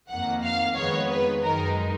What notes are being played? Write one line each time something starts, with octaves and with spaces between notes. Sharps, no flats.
F2 D#3 A#3 F#5
F5
F2 D#3 G#3 B3 C#5
B4
F#2 D#3 G#3 D#4 A#4